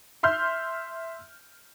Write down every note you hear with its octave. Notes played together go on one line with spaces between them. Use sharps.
E5 C6 F6 G6